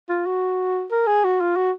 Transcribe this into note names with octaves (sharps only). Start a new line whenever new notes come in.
F4
F#4
A#4
G#4
F#4
F4
F#4